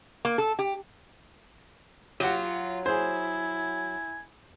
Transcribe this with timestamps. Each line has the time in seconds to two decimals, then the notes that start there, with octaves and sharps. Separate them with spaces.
0.25 A#3
0.38 A4
0.59 G4
2.20 F#3 F4 G4 F#5
2.86 E4 G#4 C5 G#5